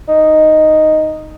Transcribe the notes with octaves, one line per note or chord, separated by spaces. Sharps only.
D#4